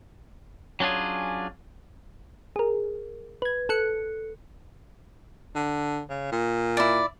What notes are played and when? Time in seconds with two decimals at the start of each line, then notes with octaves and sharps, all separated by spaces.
0.80 F#3 C#4 D4 F4 G#4
2.56 G#4 A#4
3.42 B4 G#6
3.69 A4 F#6 C#7
5.55 D3
6.09 C#3
6.32 A#2
6.77 E4 D5